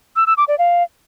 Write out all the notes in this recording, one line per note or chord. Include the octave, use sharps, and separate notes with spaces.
E6
E6
D6
D5
F5